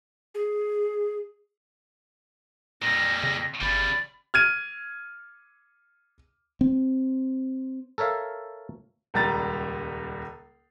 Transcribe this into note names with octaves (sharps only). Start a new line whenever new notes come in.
G#4
F2 A#2 G3 A#6
C#3
G1 C#3 G3 D5 B5
F6 G#6 D#7
C4
A4 A#4 C#5 E5 F5
D#1 C#2 G3 A#5 A6